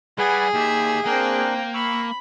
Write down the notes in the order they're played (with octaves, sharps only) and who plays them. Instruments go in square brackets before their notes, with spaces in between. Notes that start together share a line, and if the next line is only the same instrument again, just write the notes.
[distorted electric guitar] G3 [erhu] G#4 [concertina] B4 F#5 G#5
[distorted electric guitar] D#2 [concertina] G4 [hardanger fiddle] E5
[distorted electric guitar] A#3 [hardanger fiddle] C4 G5 [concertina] D4 A#4 F#6
[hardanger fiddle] B5 [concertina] C#6 E6